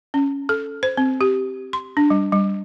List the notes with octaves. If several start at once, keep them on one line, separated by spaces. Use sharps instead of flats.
C#4
A4
C5
C4
G4
C6
D4
G3
G3